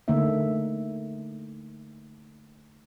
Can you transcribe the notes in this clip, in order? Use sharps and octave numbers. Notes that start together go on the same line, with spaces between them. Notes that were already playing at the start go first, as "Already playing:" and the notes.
D3 A3 A#3 D#4 E5